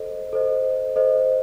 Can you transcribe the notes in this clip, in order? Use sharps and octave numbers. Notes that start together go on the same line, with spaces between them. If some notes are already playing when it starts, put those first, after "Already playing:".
Already playing: A4 C5 D#5
A4 C5 D#5
A4 C5 D#5